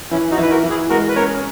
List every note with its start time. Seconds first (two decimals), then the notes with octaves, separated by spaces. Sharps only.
0.11 E3 C#4 E4
0.31 D#4 F#4
0.38 E3 B4
0.50 F#4 A#4
0.64 E3
0.70 E4 G#4
0.89 G#3 F#4 A#4
1.08 B4
1.16 C#4 A#4 C#5